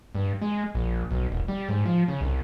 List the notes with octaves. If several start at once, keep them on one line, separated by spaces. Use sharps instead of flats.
G2
G#3
A#1
B1
D#1
G3
G#2
F3
C#3
C2